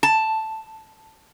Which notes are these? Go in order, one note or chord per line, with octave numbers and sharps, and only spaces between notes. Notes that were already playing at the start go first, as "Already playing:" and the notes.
A5